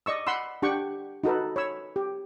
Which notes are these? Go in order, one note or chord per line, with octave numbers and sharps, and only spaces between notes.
D5 D#5 C#6 E6
F#5 B5 C6 E6
D4 G4 F#5 G5 C#6
D#4 F#4 A4 B4
C#5 B5 E6
G4